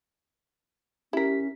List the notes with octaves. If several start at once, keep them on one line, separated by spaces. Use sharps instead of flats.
C#4 E4 G4 A#4 B6